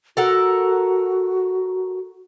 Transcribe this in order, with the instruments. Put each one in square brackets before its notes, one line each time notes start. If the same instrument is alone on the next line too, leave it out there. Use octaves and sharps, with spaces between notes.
[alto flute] F#4 [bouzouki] A4 A#4 F#5